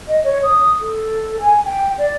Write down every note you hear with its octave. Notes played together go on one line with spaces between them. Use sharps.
D#5
C#5
D#6
A4
G#5
G5
D5